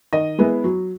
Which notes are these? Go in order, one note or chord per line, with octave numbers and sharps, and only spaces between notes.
D#3 D#5
G#3 B3 E4
F#3